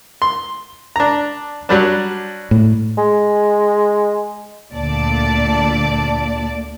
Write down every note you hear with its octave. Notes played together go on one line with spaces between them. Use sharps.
C6
D4 A#5
F#3 G3 D4
A2
G#3
D2 A#2 D5 A5